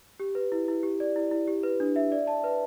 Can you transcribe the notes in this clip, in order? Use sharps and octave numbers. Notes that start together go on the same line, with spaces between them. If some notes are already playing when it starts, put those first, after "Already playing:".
G4
B4
E4
E4
G4
D5
E4
E4
G4
B4
D4
E5
D5
A5
B4